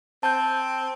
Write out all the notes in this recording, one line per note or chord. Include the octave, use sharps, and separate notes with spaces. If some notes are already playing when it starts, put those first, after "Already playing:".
C4 A5 G6